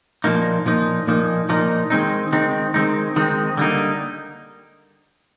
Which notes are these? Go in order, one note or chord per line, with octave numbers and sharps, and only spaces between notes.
A#2 F3 A#3 D#4
A#2 F3 A#3 D#4
A#2 F3 A#3 D#4
A#2 F3 A#3 D#4
D#3 G#3 C4 D#4
D#3 G#3 C4 D#4
D#3 G#3 C4 D#4
D#3 G#3 C4 D#4
D3 G3 A#3 D#4